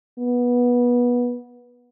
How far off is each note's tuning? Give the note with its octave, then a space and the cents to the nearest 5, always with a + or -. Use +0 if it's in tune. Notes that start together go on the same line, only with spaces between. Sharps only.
B3 -20